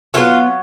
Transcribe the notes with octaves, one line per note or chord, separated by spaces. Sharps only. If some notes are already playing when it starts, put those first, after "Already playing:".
D3 F#3 B3 F4 F5